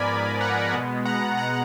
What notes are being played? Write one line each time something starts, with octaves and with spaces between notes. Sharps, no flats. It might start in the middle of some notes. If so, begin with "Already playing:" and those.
Already playing: G#2 F3 B3 A#4 D5 G#5 B5
F#5 A#5
B2 G#3 B3
F#5 A#5
F#5 A#5